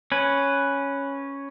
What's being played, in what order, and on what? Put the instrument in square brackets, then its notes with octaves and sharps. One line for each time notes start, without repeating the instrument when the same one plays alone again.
[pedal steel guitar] C#4 B4